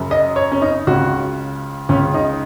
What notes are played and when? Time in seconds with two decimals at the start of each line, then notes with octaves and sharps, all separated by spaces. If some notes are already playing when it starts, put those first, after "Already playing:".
Already playing: F#2 C#3
0.11 D#5
0.36 C#5
0.52 C#4
0.62 D#4
0.87 C#2 C#3 F#4
1.89 C#2 C#3 C#4
2.14 D#4